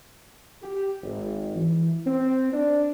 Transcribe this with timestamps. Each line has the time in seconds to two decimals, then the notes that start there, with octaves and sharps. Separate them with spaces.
0.63 G4
1.03 G#1
1.56 E3
2.06 C4
2.53 D4